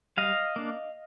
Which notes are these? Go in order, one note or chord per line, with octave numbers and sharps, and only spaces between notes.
G3 D#5 F5
A#3 D4